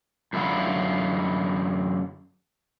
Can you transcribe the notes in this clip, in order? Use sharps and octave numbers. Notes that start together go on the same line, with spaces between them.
F#2 D3 E4 F4 F#5